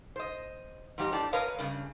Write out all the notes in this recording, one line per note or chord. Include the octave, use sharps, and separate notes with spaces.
C5 D#5
G#2 F3 G4 D#5
A2 D4 G4 D5
A#4 B4 C#5 D#5 F5
G2 C#3